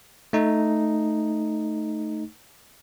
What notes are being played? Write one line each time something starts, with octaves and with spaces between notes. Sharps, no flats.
A3 D#4